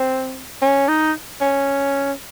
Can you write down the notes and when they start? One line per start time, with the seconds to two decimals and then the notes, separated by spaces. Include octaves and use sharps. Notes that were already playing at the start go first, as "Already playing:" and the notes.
Already playing: C4
0.62 C#4
0.88 D#4
1.41 C#4